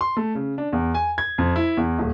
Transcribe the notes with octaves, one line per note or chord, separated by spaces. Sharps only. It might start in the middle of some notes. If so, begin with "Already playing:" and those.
C6
A3
C#3
D4
E2
G#5
G#6
F2
E4
E2
D#1